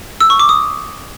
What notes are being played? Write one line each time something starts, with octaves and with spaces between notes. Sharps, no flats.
E6
C#6
D6
D#6